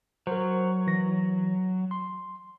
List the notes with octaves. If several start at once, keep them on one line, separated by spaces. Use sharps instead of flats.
F#3 A#4 C5
E3 A#6
C6